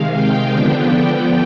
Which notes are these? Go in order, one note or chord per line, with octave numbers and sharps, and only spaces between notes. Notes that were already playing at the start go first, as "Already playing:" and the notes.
Already playing: C3 D#3 G#3 F5
G5
D3 F3 B3 D4 G5